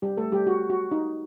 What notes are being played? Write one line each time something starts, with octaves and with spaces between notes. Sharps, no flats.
G3 G4
A3 A4
G3 G4
F#4
F#4
D#4